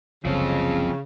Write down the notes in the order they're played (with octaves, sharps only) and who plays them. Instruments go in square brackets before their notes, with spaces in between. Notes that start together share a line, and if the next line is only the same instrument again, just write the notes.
[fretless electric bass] F#1 C2 [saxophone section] C#3 [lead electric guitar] F3 C4